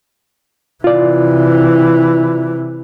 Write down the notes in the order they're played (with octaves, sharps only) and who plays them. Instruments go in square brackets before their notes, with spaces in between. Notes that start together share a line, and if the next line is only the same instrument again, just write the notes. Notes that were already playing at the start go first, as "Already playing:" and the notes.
[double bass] C3 E3 [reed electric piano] F4 D5